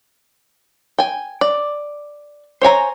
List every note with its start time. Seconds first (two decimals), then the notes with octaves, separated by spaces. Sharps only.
0.99 G5 G#5
1.41 D5
2.62 C5 C#5 G#5 A#5